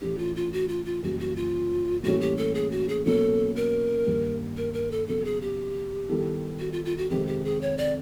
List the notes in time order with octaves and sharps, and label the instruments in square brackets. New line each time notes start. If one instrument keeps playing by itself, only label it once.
[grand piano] A2 E3 A3 C#4 [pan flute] G4
[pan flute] F4
F4
F#4
F4
F4
[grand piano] F#2 C#3 E3 G3 A#3 [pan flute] F#4
[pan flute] F#4
F4
[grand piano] A2 E3 G3 A#3 C#4 [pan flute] F#4
[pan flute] G4
A4
G#4
F#4
G#4
[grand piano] B2 F#3 A#3 C#4 [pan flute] A4
[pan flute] A#4
[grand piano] G2 D#3 G3 A#3
[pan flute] A#4
A#4
A4
[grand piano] C#3 F#3 B3 [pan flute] A4
[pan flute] G#4
G4
[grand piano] D#3 G3 B3 E4 A4
[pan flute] F#4
F4
F4
F#4
[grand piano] F2 C3 D#3 G#3 C4 [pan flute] G4
[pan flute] G4
G#4
C#5
D5